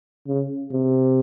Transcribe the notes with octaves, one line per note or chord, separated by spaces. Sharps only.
C#3
C3